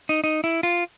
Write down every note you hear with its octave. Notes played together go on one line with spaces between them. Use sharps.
D#4
D#4
E4
F4